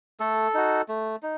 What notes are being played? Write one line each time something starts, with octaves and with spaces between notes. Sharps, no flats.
A3 A4
D#4 F#4
A3
D#4